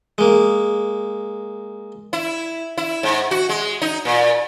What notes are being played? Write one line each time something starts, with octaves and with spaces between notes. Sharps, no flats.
G#3 A#3
E4
E4
G#2
F#4
G#3
D#4
A#2